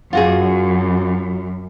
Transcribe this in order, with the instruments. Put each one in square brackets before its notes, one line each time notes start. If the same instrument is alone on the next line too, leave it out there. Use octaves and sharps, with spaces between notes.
[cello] F#2 [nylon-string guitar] F4 F#4 G#4